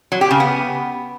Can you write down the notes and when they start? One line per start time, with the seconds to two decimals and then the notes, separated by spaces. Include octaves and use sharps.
0.12 F#3
0.21 G4
0.31 C#3
0.40 B3